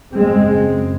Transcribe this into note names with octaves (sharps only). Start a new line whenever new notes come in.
F#2 C#3 G#3 C4